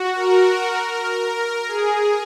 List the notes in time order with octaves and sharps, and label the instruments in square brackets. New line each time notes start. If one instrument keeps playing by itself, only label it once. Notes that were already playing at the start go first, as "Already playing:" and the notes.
Already playing: [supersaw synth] F#4
A#4
A#4
G#4